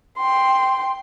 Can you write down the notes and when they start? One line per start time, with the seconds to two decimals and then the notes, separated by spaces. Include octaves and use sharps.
0.18 G5 C6